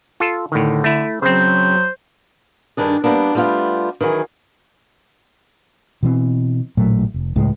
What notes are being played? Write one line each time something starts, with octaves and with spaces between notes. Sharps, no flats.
F4 A4
A2 D3 D#3
A3 E4
C#3 F#3 C4 C5
G2 D#3 D4 G#4
G3 A#3 B3 D4
G3 A3 B3 F4 G4
D#3 E3 F#3 G#4
B2 E3 C4
A1 A#2 F#3 A3
F1
C#2 A2 G#3